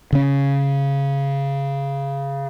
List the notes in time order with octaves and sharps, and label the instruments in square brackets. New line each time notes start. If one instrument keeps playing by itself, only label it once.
[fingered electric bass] C#3 C#4